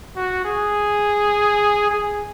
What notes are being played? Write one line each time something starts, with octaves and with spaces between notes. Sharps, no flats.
F#4
G#4
G#4